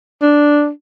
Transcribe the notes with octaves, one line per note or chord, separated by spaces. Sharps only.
D4